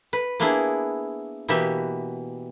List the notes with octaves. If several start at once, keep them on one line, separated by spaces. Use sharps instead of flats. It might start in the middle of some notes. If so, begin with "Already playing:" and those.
B4
A#3 B3 D4 E4 G#4
B2 E3 A#3 B3 G4 E5